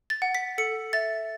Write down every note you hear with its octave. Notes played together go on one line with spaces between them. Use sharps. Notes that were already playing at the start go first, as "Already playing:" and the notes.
A6
F#5
B6
A4 C#7
E5 A6